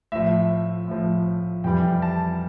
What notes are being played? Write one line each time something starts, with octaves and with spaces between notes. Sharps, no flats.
A2 F3 E5
A2 F3
F2 E3 G3 G5
A5